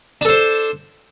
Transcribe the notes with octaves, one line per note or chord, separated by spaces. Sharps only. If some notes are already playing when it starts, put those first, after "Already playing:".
D4 A4 C5